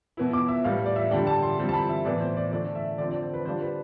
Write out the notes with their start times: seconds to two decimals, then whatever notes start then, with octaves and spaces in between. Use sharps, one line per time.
0.17 B2 B3 E4
0.33 D6
0.48 E5
0.64 A2 G3 B3 F5
0.86 D5
0.96 E5
1.11 D3 G3 D4 G5
1.27 A5
1.43 C6
1.57 D3 G3 C4 E4
1.69 A5
1.74 B5
1.89 E5
2.05 A2 E3 B3 D5
2.20 C5
2.37 D5
2.52 D3 A3 D4 D5
2.75 E5
2.98 D3 F3 C4 D5
3.10 D5
3.22 C5
3.34 B4
3.45 D3 G3 D4 F4 C5
3.61 B4